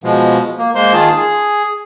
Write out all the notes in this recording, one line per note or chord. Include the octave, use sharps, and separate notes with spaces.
B2 F3 G#3
A#3
G#3 A#3 C5 C6
D#3 F4 G#4 A5
G#4